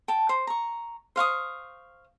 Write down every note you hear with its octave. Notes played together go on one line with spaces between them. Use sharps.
G5 A5
C5
A#5 C#6
C5 F5 C#6 D#6